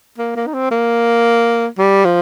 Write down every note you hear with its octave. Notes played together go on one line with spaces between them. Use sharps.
A#3
A#3
D#4
C4
A#3
G3
F3